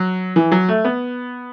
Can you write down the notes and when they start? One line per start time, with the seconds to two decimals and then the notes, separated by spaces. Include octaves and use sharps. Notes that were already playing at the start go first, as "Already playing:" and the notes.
Already playing: F#3
0.36 E3
0.52 F#3
0.68 A3
0.85 B3